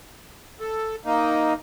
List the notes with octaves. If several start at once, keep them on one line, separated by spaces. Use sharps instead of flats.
A4
A#3 D#4